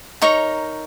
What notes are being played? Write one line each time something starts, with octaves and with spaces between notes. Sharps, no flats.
D#4 A#4 C#5 A#5 C#6